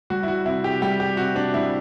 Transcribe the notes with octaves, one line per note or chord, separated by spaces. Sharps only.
G3 F#4
E4
F#4
C3 E4
G4
G3 G4
G4
C3 F#4
D4
G3 E4